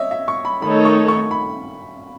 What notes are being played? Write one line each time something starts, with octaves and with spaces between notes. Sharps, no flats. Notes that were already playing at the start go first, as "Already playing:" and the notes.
Already playing: C#5 D#5 E5
E5
C#6
B5
D#3 A3 D#4 A4 C#5 B5
C#6
C#6
B5